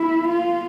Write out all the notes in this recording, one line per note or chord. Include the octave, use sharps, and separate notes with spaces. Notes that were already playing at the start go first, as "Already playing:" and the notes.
Already playing: E4
F4